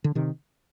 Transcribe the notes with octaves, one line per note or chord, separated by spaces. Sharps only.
D3
C3 D#3